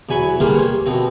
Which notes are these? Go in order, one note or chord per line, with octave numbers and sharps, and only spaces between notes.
E2 F#3 G#5 B5 C#6
G3 A#3 B3 F4 G#4 C5
C#5
B2 F3 C4